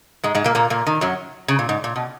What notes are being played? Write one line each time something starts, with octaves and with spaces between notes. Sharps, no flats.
G#2 G#3
G#2 G#3
A#2 A#3
A#2 A#3
A#2 A#3
D#3
F#2 F#3
C#3
A#2
G#2
A#2
B2